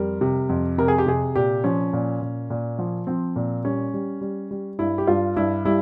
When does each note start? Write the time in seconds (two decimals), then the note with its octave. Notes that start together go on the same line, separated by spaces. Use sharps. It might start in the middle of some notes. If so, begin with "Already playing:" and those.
Already playing: F2 G3 A#4
0.21 C3
0.49 F2
0.78 C3 A#4
0.88 G#4
0.98 G4
1.06 C3 G#4
1.35 A#2 G4
1.64 F3 C#4
1.93 A#2
2.22 A#2
2.50 A#2
2.79 F3
3.07 F3 C4
3.36 A#2
3.64 G3 C#4
3.94 G3
4.21 G3
4.51 G3
4.79 G2 E4
4.98 G4
5.07 G2 F4
5.36 G2 E4
5.65 G3 E4